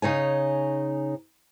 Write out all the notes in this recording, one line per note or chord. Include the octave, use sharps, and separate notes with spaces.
C#3 D#4 C#5 G#5